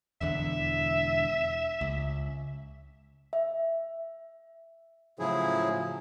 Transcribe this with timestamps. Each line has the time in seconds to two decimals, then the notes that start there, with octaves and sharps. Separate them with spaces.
0.21 E1 E2 D3 E5
1.81 C#2
3.33 E5
5.19 A2 C#3 F3 F#3 E4 G#4